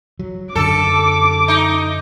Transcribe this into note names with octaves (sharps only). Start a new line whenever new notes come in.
F#3
F#2 D3 A4 D6
D#4